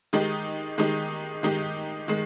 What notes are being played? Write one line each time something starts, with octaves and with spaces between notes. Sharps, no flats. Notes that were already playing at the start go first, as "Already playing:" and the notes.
D#3 G#3 D#4 G4
D#3 G#3 D#4 G4
D#3 G#3 D#4 G4
D#3 G#3